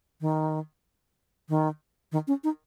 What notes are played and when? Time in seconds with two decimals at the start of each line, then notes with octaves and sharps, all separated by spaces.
0.21 D#3
1.49 D#3
2.12 D#3
2.27 C#4
2.44 D#4